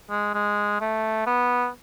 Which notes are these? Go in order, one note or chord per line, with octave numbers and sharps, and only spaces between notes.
G#3
G#3
A3
B3